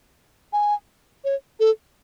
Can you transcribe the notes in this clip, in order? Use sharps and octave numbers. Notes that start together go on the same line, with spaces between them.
G#5
C#5
A4